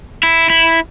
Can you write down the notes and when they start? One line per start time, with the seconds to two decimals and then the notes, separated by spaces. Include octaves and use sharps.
0.23 E4
0.50 E4